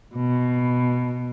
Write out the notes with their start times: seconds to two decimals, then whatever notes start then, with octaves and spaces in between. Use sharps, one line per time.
0.16 B2